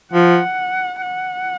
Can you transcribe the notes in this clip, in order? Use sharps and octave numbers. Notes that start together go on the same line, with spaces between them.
F3 F#5
F#5